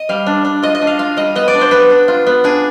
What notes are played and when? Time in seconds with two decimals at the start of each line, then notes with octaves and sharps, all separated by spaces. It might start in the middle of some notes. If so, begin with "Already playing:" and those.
Already playing: D#5
0.09 G3 F5
0.26 D4
0.45 D4
0.62 F4 D#5
0.75 D#5
0.82 D4
0.87 F5
0.99 F4 F5
1.17 G3 D#5
1.35 B3 D#5
1.48 D5
1.54 D4
1.61 C5
1.71 B3 B4
1.90 D4
2.08 F4
2.26 B3
2.44 D4 G#4